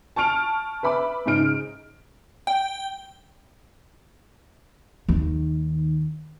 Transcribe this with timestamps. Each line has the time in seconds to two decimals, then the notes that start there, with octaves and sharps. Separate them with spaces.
0.16 A5 C#6 F6 D7 F7
0.83 B4 E5 B5 D6
1.26 G#2 C#3 D#4 F6 D7
2.47 G5
5.09 D#2 D#3